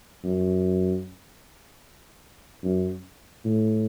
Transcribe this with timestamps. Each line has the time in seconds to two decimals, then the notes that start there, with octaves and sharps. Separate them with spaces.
0.25 F#2
2.64 F#2
3.45 A2